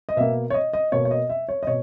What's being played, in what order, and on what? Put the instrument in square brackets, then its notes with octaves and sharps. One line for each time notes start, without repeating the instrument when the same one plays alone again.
[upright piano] D#5
B2 A#3 E5
C#5
D#5
D#5
B2 A#3 C#5
C#5
D#5
E5
C#5
D#5
B2 C#5